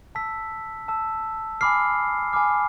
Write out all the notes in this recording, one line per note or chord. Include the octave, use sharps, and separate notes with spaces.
A5 E6 B6
A5 E6
G#5 B5 D6 F6 C7
G#5 B5 D6 F6